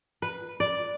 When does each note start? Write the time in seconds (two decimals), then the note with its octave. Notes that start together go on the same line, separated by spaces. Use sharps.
0.22 B4
0.60 D5